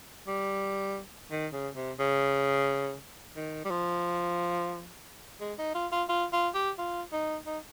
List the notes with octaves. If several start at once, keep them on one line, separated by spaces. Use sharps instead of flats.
G3
D#3
C#3
C3
C#3
D#3
G3
F3
G#3
D#4
F4
F4
F4
F4
G4
F4
D#4
D#4